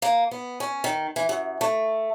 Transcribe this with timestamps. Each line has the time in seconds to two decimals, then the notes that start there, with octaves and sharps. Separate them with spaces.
0.02 A#3
0.31 B3
0.60 C#4
0.84 D#3
1.16 E3
1.29 F#2
1.61 A3